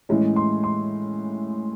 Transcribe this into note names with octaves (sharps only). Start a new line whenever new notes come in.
A2 E3 G#3 C#4
C6
C6